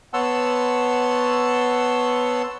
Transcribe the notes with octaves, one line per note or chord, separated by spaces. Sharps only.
B3 C#5 F#5 A5 C6 E6